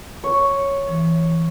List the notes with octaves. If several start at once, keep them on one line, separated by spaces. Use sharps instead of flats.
C#5
E3